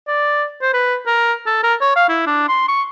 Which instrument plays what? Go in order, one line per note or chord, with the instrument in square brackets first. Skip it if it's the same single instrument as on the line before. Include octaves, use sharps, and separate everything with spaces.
[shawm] D5
C5
B4
A#4
A4
A#4
C#5
F5
E4
D4
C6
C#6